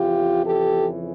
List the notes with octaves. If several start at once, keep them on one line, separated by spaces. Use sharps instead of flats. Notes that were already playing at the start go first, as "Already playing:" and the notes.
Already playing: F2 C#3 E3 F4 G4
G4 A4